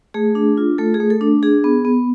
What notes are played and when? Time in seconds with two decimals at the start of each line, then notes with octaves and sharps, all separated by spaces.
0.14 A3 G#4
0.35 D4
0.57 F4
0.78 A3 A4
0.94 G#4
1.00 A3
1.10 A4
1.21 D4
1.43 D4 G#4
1.64 B3
1.85 B3